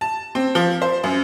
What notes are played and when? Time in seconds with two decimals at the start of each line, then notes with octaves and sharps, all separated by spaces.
0.01 A5
0.35 C4
0.55 F3
0.82 C5
1.04 F#2